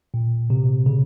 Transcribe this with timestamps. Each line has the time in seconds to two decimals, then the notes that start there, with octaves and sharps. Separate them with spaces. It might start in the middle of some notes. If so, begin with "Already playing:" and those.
0.14 A#2
0.50 C3
0.86 C#3